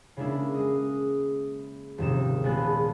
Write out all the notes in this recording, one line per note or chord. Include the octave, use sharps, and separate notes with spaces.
C#3 G#3 A#3 D4 E4
G#3 D#5
D#1 G#2 C3 F3 D#4 E7
A#1 G#3 B3 A4 G#5 F#6